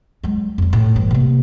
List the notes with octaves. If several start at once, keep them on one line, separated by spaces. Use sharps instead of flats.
F#3 G#3
F2 F#3
A2
G2 E3
C3 A#3